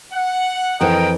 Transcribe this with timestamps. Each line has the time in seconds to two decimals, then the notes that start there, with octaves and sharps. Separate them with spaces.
0.13 F#5
0.81 F2 E3 A#4 D#5 G5